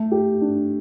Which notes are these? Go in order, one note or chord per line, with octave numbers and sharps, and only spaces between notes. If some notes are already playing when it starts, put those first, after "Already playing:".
Already playing: A3
G4
D4